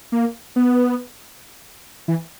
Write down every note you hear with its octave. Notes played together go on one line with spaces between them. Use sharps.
A#3
B3
E3